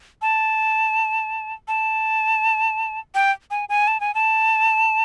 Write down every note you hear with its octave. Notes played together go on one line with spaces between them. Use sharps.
A5
A5
G5
G#5
G#5
A5
G#5
A5